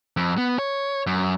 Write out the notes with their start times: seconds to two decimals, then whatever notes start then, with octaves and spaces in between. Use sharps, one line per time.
0.17 F2
0.38 B3
0.59 C#5
1.07 F#2